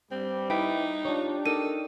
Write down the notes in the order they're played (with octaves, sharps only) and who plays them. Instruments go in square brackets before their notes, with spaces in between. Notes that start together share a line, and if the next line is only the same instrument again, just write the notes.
[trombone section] G2 G3 [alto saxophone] C4
[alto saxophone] D#4 [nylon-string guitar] E4 B4 D5 [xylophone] G5 B6
[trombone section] D4 G4 [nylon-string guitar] F4 C#5
[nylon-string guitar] D#4 A#4 G5 [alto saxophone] A4 [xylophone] D#7